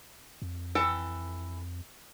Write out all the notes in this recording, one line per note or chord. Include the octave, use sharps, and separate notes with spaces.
F2
E3 A4 G5